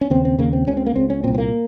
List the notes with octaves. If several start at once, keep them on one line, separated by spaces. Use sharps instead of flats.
C#4
D#2 C#3 C4
C4
D#2 C#3 A#3
C4
C#2 C#3 C#4
C4
A#3
C#2 C#3 C4
C#4
C2 A#2 C4
C4
A#3